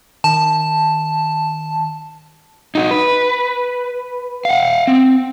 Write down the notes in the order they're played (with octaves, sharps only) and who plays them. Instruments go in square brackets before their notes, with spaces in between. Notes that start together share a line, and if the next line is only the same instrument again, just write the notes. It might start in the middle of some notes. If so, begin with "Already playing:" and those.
[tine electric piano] D#3 [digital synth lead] A5
[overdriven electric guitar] D#4 F#4
B4
F5 F#5
C4